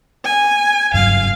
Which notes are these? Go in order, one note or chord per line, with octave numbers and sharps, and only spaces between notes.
G#5
F#1 G2 F#3 F5